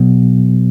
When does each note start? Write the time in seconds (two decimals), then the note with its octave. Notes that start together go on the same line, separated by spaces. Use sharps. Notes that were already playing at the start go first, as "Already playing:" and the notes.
Already playing: B2 F#3 B3